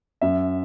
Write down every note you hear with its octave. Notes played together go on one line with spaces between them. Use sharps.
F#2 E5